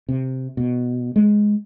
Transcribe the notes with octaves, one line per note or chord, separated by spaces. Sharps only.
C3
B2
G#3